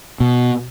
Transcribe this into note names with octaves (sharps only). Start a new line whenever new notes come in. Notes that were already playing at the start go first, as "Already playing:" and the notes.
B2